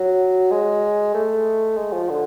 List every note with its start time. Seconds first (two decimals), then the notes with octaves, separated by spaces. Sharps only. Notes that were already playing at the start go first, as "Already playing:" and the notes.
Already playing: F#3
0.51 G#3
1.15 A3
1.77 G#3
1.92 F3
2.09 D3